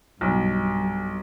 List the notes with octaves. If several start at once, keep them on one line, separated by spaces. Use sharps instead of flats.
B1 G2